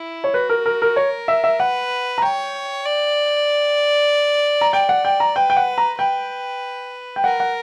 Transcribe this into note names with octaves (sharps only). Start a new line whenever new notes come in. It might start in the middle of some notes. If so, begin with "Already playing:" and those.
Already playing: E4
C#5
F#4 B4
A#4
A#4
A#4
A#4 C#5
E5
E5
B4 F#5
A#5
C#5 G5
D5
A#5
D5 G5
F#5
G5
A#5
B4 G5
G5
F#5
A#5
B4 G5
G5
A#4 F#5
F#5